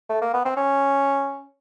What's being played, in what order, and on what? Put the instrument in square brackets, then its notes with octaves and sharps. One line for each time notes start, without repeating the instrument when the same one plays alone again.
[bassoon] A3
A#3
B3
C4
C#4